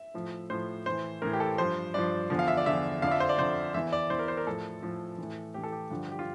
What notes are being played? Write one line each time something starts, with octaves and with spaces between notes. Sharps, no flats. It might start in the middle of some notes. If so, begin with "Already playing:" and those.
Already playing: E5
A2 F3
A2 F3 C5
A2 E3 C5
A2 E3 A#4
G4
A4
G2 F3 C5
G2 F3 D5
E2 D3 F3
F5
E5
D5
E2 D3 F3 E5
F2 D3 F3 D5 F5
E5
C5
D5
F2 D3 F3 C5
E2 E3 E5
D5
E2 E3 C5
A#4
C5
A#4
A2 F3 A4
A2 F3
A2 E3
A2 E3 G4
A4
G4
G2 D3 F3
G4
F4